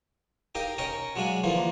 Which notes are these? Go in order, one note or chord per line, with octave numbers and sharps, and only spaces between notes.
D#4 G4 A#4 D#5 F5 G5
C#4 A#4 C#5 D#5 G5
F#3 G#3 D4 F5 G#5
D3 E3 F3 A#3